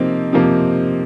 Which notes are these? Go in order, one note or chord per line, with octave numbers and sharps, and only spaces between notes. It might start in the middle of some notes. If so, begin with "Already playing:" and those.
Already playing: C3 F3 A#3 C4 D#4
C3 F3 A#3